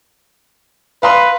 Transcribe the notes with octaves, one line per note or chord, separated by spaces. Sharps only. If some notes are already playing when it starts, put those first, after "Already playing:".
B4 F5 A#5 C6